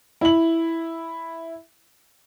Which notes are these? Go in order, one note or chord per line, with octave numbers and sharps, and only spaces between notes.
E4 F#7